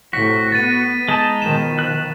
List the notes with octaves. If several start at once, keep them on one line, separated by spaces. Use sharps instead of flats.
A2 C3 F#4 B6
B3 A6 D#7
G#3 D#4 A5
B2 D#3 F3 E7
F#6